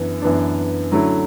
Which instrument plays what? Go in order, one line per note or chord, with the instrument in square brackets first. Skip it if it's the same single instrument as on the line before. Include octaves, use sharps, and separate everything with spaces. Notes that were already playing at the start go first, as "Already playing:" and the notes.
Already playing: [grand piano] F#2 E3 B3 D4
F#2 E3 B3 D4
D3 F#3 A3 C#4 E4